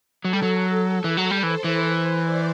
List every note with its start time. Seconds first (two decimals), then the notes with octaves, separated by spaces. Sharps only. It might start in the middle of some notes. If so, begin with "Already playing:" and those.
0.24 F#3 A4
0.33 G3
0.43 F#3
0.64 A4
1.04 E3
1.17 F#3
1.31 G3
1.43 E3 C5
1.64 E3
2.23 D5